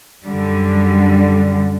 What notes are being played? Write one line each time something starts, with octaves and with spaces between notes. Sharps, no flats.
F#2 D3 G3